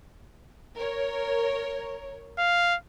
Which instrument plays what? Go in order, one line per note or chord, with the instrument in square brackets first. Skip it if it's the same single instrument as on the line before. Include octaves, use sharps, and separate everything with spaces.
[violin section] A#4 C#5
[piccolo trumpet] F5